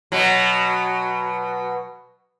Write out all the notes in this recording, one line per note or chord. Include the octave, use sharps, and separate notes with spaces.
B2 F#3